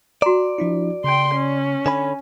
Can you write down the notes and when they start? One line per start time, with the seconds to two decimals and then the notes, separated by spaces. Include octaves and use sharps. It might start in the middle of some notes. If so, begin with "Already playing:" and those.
0.22 F#4 D5 A#5
0.58 F3 D4 E4
1.04 C#3 G5 C6
1.35 C#4
1.86 D3 C#5 G#5 B5